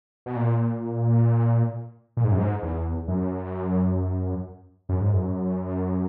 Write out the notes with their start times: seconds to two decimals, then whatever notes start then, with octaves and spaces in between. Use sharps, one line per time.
0.26 B2
0.36 A#2
2.17 A#2
2.25 G#2
2.32 F#2
2.39 G#2
2.62 E2
3.08 F#2
4.89 F#2
5.01 G#2
5.13 F#2